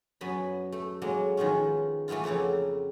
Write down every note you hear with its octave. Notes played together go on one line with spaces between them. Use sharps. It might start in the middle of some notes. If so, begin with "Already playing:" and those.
F#2 B3 G#5 B5
A3
F#3 G#3 A#3
D#3 F3 G#3 B3 C#4
E3 A3 B3 E4 F4
F2 C#3 A3 A#3 C4